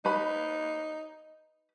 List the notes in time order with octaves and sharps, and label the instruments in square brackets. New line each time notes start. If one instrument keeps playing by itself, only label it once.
[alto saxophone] D#4 [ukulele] B4 B5